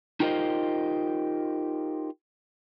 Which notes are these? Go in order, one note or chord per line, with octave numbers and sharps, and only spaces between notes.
D#4 F4 G4 A#4 C5 D#5